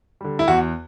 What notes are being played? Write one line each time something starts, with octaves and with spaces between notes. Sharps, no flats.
D3 G3
E4
E2 F#4